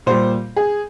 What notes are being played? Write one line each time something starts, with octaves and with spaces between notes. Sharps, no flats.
A#2 G3 C5
G#4